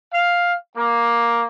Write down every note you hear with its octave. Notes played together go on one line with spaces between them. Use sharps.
F5
A#3